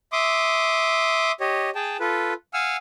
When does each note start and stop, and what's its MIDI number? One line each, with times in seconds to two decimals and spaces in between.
0.12 1.32 76
0.12 1.32 84
0.12 1.32 86
0.12 1.32 87
1.40 1.70 67
1.40 1.70 73
1.40 1.70 75
1.75 1.97 68
1.75 1.97 79
1.75 1.97 81
2.00 2.33 65
2.00 2.33 69
2.00 2.33 71
2.54 2.77 77
2.54 2.77 78
2.54 2.77 80
2.54 2.77 88
2.54 2.77 89